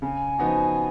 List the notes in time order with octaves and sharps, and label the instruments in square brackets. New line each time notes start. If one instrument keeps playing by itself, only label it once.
[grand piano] C#3 [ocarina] G#5
[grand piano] F3 B3 D#4 F#4